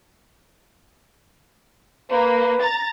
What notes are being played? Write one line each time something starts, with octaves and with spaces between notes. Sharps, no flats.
A#3 B4
A#5 A6